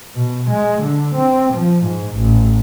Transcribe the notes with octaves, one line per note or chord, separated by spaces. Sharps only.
B2
G#3
D3
C4
F3
G#2
A1